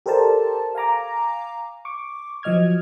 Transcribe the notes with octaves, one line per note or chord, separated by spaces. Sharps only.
G4 A4 A#4 C5 D5 A5
F5 G#5 A#5 D6
C#6 D6
F3 F#3 D#5 F6 G#6